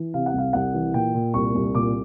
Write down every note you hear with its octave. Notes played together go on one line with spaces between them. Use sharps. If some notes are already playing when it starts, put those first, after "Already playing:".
Already playing: E3
C3 F5
F#5
C2
F5
C2 F#5
E3
A#2 G5
A#2
C2 C#6
C2
A#2 D6